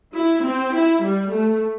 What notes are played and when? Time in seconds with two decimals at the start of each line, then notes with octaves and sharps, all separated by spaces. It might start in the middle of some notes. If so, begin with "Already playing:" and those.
0.15 E4
0.44 C4
0.74 E4
1.02 G3
1.32 A3